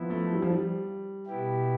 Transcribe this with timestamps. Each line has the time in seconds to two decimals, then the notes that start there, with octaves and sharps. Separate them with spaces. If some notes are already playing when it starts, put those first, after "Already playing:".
Already playing: F3 B3 E4
0.10 A3
0.33 G3
0.42 F3
0.50 G3
1.26 B2 B3 E4 G4